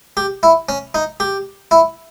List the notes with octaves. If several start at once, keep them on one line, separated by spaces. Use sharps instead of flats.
G4
E4
C#4
D#4
G4
E4